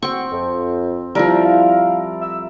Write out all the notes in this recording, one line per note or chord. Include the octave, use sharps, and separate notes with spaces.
C4 F#4 G5 C#6
F2
F3 G3 E4 A4 A#4
F5
E5 E6